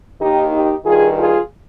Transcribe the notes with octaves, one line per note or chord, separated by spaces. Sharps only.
D#2 D#3 D#4 G4
D#4 G4
G2 D#3 F4 G#4
F4 G#4